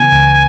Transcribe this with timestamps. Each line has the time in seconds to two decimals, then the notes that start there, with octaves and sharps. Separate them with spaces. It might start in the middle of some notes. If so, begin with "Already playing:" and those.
Already playing: C#3 E3 B3 G#5
0.12 C#2